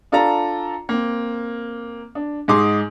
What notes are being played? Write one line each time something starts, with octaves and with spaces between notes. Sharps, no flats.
D4 F4 A4 D5 A5 A#5
A#3 C4
D4
G#2 D#4 G#4 C6 D6